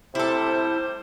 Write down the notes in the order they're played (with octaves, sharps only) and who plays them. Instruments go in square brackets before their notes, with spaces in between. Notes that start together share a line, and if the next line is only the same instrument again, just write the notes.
[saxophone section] A2 G3 C5 [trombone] C3 [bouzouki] E4 A4